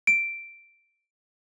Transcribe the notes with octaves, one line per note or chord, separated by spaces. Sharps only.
D7